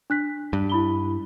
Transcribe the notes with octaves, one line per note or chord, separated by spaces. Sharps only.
D4 F#6 B6
G2
E4 B5 G7